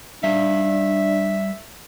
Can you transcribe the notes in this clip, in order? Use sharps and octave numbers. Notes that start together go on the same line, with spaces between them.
G3 D4 E5 F5